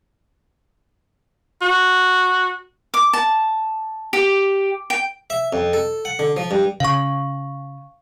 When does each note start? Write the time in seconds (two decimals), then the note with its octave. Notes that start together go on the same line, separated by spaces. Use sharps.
1.61 F#4
2.94 D6
3.13 A5
4.13 G4
4.90 G5
5.30 E5
5.53 F2
5.73 A4
6.05 F#5
6.19 D3
6.37 F3
6.51 G2
6.80 C#3 F5 C#6